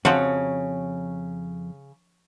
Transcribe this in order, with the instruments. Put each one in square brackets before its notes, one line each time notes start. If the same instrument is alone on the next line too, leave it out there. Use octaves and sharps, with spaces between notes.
[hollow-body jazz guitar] F2 [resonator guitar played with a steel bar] C#3 [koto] F3 F#4 [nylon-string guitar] C#5